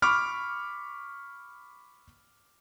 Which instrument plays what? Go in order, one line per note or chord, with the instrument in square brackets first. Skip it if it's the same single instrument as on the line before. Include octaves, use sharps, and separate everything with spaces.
[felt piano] B5 C#6 D6 F6